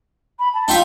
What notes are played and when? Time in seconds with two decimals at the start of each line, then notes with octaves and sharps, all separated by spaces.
0.39 B5
0.53 A5
0.68 D#4 F4 E5 G5